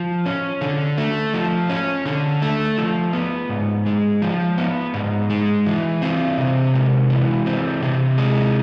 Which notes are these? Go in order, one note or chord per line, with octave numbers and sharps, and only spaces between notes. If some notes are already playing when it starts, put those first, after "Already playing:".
Already playing: F3
C#4
D3
A3
F3
C#4
D3
A3
F3
B3
G#2
G#3
F3
B3
G#2
G#3
E3
C4
C3
G#3
E3
C4
C3
G#3